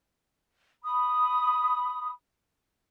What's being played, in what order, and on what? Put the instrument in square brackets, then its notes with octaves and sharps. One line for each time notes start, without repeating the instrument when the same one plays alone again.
[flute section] B5 D#6